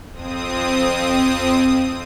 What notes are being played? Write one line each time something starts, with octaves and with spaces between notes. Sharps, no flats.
F2 C4 D#6